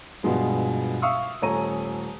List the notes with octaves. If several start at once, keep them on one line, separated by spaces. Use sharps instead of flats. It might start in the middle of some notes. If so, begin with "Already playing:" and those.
G2 B2 F3 G#3 B3
E5 F5 C#6 D#6 E6
D#1 A3 C#5 G#5 A#5 D#7